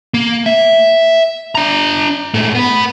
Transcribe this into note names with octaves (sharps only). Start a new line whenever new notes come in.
A#3
E5
D4 A#5
G#2 A3
B3 B4